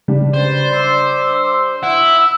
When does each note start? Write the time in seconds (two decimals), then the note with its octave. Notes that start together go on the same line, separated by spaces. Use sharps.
0.08 C#3 G3 D4
0.34 B4 C5 D5
0.73 E5 C6 D6 E6
1.83 E4 F#5 E6